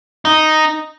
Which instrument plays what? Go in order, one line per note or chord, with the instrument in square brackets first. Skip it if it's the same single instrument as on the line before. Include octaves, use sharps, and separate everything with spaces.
[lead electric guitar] D#4